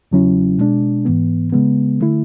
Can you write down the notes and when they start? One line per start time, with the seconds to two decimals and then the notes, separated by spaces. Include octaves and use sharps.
0.11 E2 C#3 F#3 C#4 E4
0.59 B2 G#3 D4
1.05 G#2 E3 B3
1.52 C#3 G#3 B3
2.00 D3 A3 E4